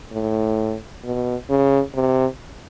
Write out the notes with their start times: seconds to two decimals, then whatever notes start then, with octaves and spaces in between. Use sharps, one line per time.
0.12 A2
1.04 B2
1.49 C#3
1.94 C3